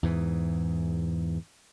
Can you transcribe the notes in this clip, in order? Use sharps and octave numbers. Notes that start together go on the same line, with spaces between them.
E2 G#2 E3